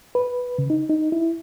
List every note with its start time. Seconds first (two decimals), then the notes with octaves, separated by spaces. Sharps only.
0.15 B4
0.58 C#3
0.70 D#4
0.89 D#4
1.12 E4